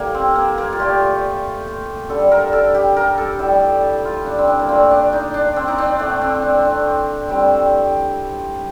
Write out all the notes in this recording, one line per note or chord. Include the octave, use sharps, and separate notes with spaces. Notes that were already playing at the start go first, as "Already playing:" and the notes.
Already playing: A2 G3 A#3
C4
A#3
A#3
F4
A#2 A3 G4
D3 G3 A4
A#4
A4
G4
A#4
A4
A2 G3
F4
D4
C4
D4
A#3
A#2 A3 C4
D4
D#4
D4
C4
D#4
D4
A2 A3 C4
C4
D4
D4
A2 G3 C4